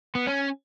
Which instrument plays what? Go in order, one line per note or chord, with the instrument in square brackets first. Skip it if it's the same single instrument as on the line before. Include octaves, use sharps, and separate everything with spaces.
[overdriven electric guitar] B3
C#4